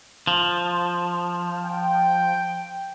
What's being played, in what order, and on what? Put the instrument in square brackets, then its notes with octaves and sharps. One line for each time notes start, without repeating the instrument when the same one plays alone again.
[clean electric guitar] F3
[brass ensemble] G5